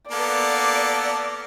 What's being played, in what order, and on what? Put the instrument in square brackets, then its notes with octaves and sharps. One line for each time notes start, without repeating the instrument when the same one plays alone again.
[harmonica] A#3 B3 A4 [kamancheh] D5